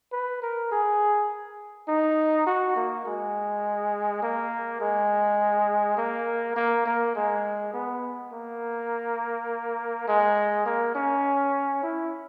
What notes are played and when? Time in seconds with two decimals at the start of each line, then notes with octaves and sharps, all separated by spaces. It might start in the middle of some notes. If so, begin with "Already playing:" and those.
0.12 B4
0.42 A#4
0.72 G#4
1.88 D#4
2.46 F#4
2.76 A#3
3.05 G#3
4.22 A#3
4.81 G#3
5.97 A#3
6.56 A#3
6.86 A#3
7.15 G#3
7.74 B3
8.32 A#3
10.08 G#3
10.66 A#3
10.95 C#4
11.83 E4